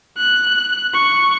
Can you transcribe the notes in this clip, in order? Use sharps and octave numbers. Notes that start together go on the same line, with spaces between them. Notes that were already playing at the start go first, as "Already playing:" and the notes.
F#6
C#6